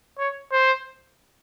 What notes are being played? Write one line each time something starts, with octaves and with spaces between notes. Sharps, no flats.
C#5
C5